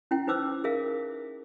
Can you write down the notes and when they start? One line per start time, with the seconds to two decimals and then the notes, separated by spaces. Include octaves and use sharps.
0.11 C#4 E4 G5
0.27 D#4 B4 C5 D6 E6
0.64 G#4 A#4 E5 F5